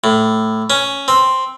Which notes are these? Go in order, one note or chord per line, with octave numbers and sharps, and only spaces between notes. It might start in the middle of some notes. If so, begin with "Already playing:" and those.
A2
C#4
C4